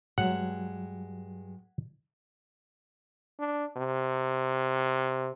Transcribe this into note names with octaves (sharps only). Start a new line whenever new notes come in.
G2 F#3 G#3 F#5
D4
C3